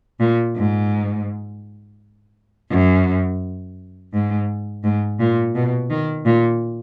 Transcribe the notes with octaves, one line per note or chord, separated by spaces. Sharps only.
A#2
G#2
F#2
G#2
G#2
A#2
B2
D#3
A#2